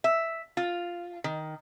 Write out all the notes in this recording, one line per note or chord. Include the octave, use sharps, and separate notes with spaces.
E5
F4
D#3